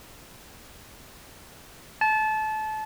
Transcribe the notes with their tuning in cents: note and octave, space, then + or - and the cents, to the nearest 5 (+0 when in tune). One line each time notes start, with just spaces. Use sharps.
A5 -25